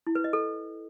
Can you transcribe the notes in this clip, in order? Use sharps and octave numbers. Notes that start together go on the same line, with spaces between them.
E4
B4
D#5
A4